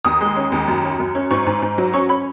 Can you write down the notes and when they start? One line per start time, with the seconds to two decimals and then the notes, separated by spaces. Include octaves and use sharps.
0.05 D#2 D#6
0.21 G#3
0.36 C#4
0.52 D#2
0.68 F#2
0.84 C#4
1.00 F#2
1.15 C#4
1.31 G#2 C#6
1.47 G#2
1.62 G#2
1.78 F#3
1.93 C#4 C#6
2.09 C#4 B5